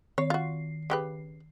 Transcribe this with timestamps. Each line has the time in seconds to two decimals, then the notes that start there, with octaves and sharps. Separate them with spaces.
0.18 D#3 C#5 C7
0.30 F4 F#4
0.90 C#3 G4 B4